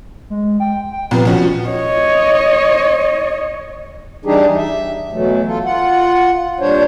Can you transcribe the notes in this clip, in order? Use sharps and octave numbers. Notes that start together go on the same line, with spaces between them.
G#3
G5
G5
C2 A#2 F3 B3
F3 C#4 F#4
C#5 D#5
E3 G3 D4 D#4 G4 G#4
E5
B2 E3 F#3 A3
F4 A4
F4 F#5
A#2 G3 D4 C5 C#5